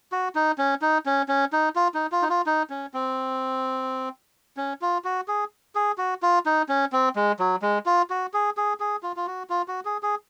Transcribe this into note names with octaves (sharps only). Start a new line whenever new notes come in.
F#4
D#4
C#4
D#4
C#4
C#4
D#4
F4
D#4
F4
D#4
F4
D#4
C#4
C4
C#4
F4
F#4
G#4
G#4
F#4
F4
D#4
C#4
C4
G#3
F#3
G#3
F4
F#4
G#4
G#4
G#4
F4
F4
F#4
F4
F#4
G#4
G#4